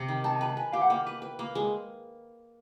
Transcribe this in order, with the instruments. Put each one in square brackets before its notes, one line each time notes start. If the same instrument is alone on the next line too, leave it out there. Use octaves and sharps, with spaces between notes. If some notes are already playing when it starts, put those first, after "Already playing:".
Already playing: [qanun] C3 C4
D#3
[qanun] D#4 [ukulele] A5
[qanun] B4 [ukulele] A#5
[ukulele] A5
[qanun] B4 [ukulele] G#5
[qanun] G4 [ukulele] F5
[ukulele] F#5
[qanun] A#3 [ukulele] G5
[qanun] B4
[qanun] B4 [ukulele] G5
[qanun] A#3
G#3